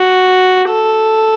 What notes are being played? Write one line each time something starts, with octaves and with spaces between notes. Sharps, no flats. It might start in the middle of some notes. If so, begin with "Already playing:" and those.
Already playing: F#4
A4